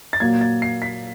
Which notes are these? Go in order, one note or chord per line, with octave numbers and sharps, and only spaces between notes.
A6
A#2 F#3 A#3 G#6
A6
C7
B6